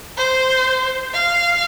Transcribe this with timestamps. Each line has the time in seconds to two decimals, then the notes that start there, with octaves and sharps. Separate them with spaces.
0.18 C5
1.14 F5